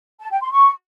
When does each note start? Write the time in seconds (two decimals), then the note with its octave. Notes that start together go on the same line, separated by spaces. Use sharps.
0.20 A5
0.31 G5
0.41 C6
0.51 C#6